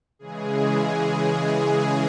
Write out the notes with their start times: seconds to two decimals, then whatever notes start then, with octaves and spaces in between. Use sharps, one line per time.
0.19 C#3 E3 G#3 G#4